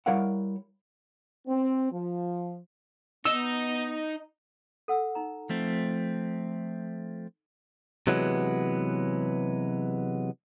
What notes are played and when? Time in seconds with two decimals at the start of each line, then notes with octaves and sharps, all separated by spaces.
0.06 G3 E4 A#4 C#5 F5 F#5
1.48 C4
1.92 F3
3.25 B3 D#4 D#5 E6
4.88 A4 F#5 E6
5.15 D#4 A#5
5.50 F3 A3 C4
8.07 C3 E3 F#3 G#3 B3